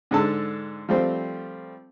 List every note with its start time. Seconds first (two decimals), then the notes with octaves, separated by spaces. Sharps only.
0.11 G#2 D3 A4 A5 E6
0.89 F3 G3 A3 C4 C5